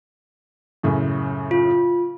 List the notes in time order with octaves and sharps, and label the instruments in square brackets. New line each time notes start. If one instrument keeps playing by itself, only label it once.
[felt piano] F#2 A2 C#3
[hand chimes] F4